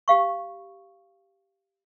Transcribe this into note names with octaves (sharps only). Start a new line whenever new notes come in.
G4 F5 C#6